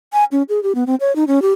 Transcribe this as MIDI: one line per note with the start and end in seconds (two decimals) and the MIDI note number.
0.13 0.24 80
0.32 0.42 61
0.49 0.62 68
0.63 0.73 67
0.75 0.84 59
0.87 0.95 60
1.00 1.14 73
1.16 1.24 63
1.27 1.42 61
1.42 1.51 67